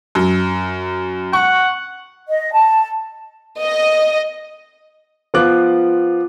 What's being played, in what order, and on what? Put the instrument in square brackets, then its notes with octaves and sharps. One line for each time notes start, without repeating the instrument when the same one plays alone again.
[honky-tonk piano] F#2
[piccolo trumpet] F#5 [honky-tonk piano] C#6
[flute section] D#5
A5
[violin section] D#5
[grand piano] F3 B3 F4 D6 F#6